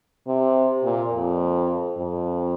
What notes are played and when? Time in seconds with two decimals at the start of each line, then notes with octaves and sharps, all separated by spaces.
0.27 C3
0.84 A#2
1.12 F2
1.98 F2